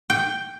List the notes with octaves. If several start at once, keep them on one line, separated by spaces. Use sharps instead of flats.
G5